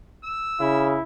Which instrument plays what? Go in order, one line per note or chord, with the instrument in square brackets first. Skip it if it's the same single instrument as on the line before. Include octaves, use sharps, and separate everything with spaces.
[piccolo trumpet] E6
[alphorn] C#3 [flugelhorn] E4